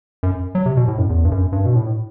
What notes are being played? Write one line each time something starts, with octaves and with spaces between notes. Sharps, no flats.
F#2
F#3
C3
B2
A2
F#2
E2
G2
F#2
G2
B2
A2